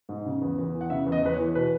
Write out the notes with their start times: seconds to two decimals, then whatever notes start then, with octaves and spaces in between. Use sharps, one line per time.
0.09 G#2
0.26 C#3
0.42 E2
0.58 E2
0.74 E3
0.81 F#5
0.90 C#3 E5
1.06 E2
1.12 D#5
1.22 E2 B4
1.33 C#5
1.38 E3
1.55 B2 B4